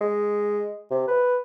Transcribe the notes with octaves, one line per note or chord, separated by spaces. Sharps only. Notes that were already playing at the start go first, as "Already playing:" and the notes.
G#3
C3
B4